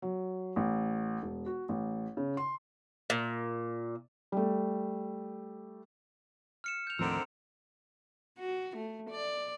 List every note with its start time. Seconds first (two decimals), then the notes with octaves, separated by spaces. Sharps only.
0.02 F#3
0.56 A1
1.23 E1
1.46 F#4
1.69 A1
2.17 C#3
2.37 C6
3.10 A#2
4.32 G3 A3
6.64 F6 C#7 E7
6.87 G6 F7
6.99 D#2 A2 D3 D#3 F3 C4 A#5 E6
8.39 F#4
8.77 A3
9.10 D5